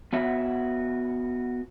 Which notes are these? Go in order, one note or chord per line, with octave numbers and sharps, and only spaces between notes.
B3 F4 F#4 C#5 E5